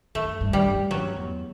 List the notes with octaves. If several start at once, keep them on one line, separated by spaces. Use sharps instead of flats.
F#2 A3
G2
G3
G2
F#2 F#3
E2